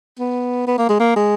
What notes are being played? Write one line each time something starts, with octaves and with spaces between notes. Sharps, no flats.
B3
B3
A#3
G#3
A#3
G#3